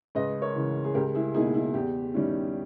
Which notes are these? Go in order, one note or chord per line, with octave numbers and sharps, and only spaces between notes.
C#2 B4 D#5
A#4 C#5
C#3 E3
G#4
C#2 G4 A#4
E4 G#4
B2 A#3 D#4 E4 G#4
E4
E2 G4
D#3 G3 C#4 E4